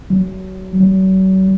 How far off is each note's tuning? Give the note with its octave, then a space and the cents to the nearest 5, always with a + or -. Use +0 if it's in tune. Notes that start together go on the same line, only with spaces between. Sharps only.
F#3 +25
F#3 +40